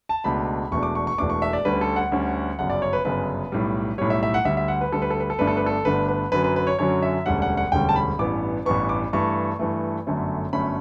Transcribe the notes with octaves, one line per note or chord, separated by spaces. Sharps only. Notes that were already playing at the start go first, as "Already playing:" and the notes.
A5
C#2 B2 A3 D4 B5
E1 E2 B2 A3 D4 C#6
D6
C#6
C#6
E1 E2 B2 A3 D4 D6
C#6
E5
D5
D2 D3 G3 C#4 B4
A4
F#5
D2 D3 G3 C#4
G1 F#2 C#3 F#5
D5
C#5
B4
G1 F#2 C#3 B4
B1 A2 G3
B1 A2 G3 C#5
E5
E5
F#5
D2 D3 G3 E5
E5
F#5
B4
D2 D3 G3 A4
B4
A4
B4
A4
G1 G2 D3 A3 D4 B4
A4
B4
A4
G1 G2 D3 A3 D4 B4
B4
F#2 D3 F#3 C#4 B4
B4
B4
C#5
F#2 D3 F#3 C#4 C#5
E5
E1 D2 D3 G3 C#4 F#5
F#5
F#5
E1 D2 D3 G3 C#4 G5
A5
B5
A1 G2 E3 B3 D6
A1 G2 E3 B3 C#6
D6
G2 E3 A3 C#6
G2 E3 A3
G1 F#2 D3 A3 C#4
G1 F#2 D3 A3 C#4 B5